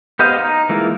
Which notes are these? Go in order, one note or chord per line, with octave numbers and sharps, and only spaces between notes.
B3 G4 C5 D#5 F5
D#4
E3 G#3 A#3 E4 F4